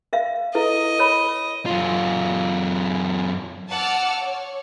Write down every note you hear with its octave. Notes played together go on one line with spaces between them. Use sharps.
A#4 E5 F5
E4 A4 B4 D#5
A#4 C#5 B5
F#2 F4
F#5 A5 D6 E6 F6
C#5